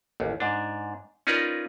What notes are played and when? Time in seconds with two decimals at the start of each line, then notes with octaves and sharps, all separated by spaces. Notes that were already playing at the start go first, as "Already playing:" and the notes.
0.20 A1 D#2
0.40 G#2 D4
1.27 C#4 D#4 F4 A#4 B4 D5